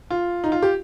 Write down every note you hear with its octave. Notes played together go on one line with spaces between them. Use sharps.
F4
D#4
F4
G4